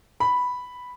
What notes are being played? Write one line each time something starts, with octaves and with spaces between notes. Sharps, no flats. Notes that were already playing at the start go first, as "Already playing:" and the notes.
B5